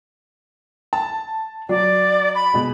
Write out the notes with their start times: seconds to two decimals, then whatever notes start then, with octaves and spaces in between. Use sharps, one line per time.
0.93 A5
1.69 F#3 D5
2.35 B5
2.54 B2 G#3